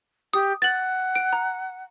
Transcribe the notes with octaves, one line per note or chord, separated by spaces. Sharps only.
G4 D#6
F#5 A6 F#7
D7
A#5